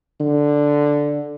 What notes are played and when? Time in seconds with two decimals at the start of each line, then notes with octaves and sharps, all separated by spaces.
0.20 D3